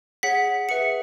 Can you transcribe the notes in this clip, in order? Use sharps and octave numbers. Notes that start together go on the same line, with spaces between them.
G#4 C#5 F#5 B6
G#4 B4 E5 C#7